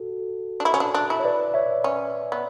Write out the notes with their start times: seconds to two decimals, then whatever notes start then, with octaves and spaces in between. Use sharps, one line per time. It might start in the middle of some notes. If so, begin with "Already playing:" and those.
Already playing: F#4 A4
0.60 D4
0.65 E4
0.74 C#4
0.80 D4
0.94 D4
1.10 E4
1.20 C#5
1.24 B4 D5
1.54 C#5 E5
1.84 C#4
2.32 B3